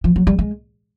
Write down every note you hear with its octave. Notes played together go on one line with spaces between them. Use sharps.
F3
F#3
G3
G#3